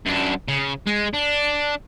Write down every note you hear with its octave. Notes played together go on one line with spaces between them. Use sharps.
F#2 D4
C#3
G#3
D4